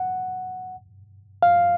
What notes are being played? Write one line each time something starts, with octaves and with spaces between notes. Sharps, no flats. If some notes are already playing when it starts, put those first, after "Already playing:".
Already playing: F#5
F5